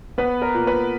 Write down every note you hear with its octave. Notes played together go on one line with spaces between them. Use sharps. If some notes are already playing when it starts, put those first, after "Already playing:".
B3 B4
A#4
A#2
B4